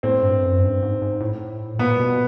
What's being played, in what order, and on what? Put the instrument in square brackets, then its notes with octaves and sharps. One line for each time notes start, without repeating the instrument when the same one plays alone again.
[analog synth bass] A2 [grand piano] C4
[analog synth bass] G2
F#2
G2
G#2
G#2
A2
[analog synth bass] A#2 [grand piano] B3
[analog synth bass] B2